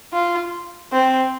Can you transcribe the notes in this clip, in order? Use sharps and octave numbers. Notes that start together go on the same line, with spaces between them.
F4
C4